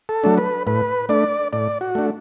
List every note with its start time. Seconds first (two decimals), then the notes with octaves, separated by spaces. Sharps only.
0.09 A4
0.24 F#3 A3 D4
0.38 B4
0.67 A2 B4
1.09 A3 D4 D5
1.53 A2 D5
1.81 F#4
1.95 A3 D4